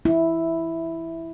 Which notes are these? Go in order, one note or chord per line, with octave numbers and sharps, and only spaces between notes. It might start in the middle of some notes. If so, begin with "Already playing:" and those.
E4